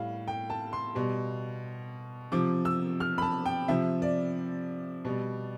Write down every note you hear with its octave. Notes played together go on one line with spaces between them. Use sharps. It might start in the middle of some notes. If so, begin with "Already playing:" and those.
Already playing: A2 G3 F5
G5
A5
C6
B2 G3
C3 F3 D6
E6
F6
B5
A5
G5
C3 F3 E5
D5
B2 G3